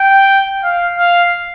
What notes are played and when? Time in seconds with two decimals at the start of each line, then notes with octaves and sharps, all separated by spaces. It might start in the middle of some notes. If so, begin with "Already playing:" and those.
Already playing: G5
0.64 F5
0.99 F5